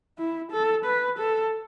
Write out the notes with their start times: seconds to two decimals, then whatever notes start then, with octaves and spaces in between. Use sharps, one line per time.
0.18 E4
0.52 A4
0.85 B4
1.19 A4